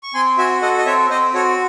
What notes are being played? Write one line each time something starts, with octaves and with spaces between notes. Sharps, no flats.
C#6
C4 G#5 C6
F#4 E5 G#5
A4 D#5 F#5
D#5
C4 C#5 E5
C4 C5 D#5
F#4 A4 C#5